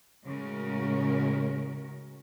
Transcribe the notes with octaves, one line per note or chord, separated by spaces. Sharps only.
A2 C#3 G#3 C#4 F#4 A#4